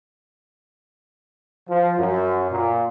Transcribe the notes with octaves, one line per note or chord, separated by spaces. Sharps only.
F3
F#2
A#2